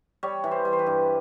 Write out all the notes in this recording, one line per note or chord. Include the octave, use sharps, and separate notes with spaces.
G3 C#5
E3
C5
G3
C5
B4
G2